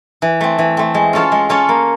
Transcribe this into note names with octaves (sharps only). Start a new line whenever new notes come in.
E3
A3 C4
E3
A3 C4
G#3
C#4 F4 A4 C#5
G#3
C#4 F4 A4 C#5
A#3